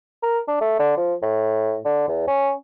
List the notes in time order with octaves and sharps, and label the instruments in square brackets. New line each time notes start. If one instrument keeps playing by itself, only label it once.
[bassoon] A#4
D4
A3
D3
F3
A2
D3
E2
C#4